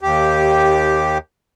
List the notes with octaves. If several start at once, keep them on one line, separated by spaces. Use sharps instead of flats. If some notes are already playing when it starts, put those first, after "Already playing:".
D#2 G4